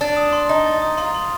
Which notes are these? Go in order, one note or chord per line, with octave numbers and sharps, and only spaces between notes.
D4 A6
D#6
C6
D#4 C6
A6
D#6
F4 C6
C6